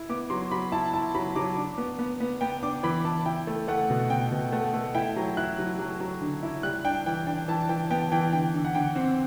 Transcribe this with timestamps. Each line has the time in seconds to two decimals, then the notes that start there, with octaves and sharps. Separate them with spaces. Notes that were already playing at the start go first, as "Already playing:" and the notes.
Already playing: E4
0.09 B3 D6
0.30 F#3 C6
0.51 F#3 B5
0.72 E4 A5
0.93 E4 A5
1.14 F#3 B5
1.35 F#3 D6
1.57 D4
1.78 B3
1.99 B3
2.20 B3
2.41 B3 G5
2.63 D4 D6
2.83 E3 B5
3.05 E3 A5
3.26 E4 G5
3.47 A3
3.68 A3 F#5
3.90 B2
4.10 B2 G5
4.32 B2
4.52 A3 F#5
4.74 A3
4.95 E4 G5
5.16 F#3
5.37 E4 F#6
5.59 F#3
5.79 F#3
6.00 F#3
6.21 D3
6.43 E4
6.63 G3 F#6
6.84 D4 G5
7.06 E3 G5
7.27 D4 G5
7.48 E3 A5
7.69 E3 G5
7.90 B3 G5
8.12 E3 G5
8.32 D3 G5
8.54 D3
8.65 F#5
8.75 D3 G5
8.96 C4